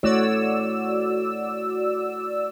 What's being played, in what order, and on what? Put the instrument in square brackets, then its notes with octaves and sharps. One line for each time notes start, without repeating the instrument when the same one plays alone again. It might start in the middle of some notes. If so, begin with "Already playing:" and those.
[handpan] A3 E4 C#5 [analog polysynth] F#4 D5 E6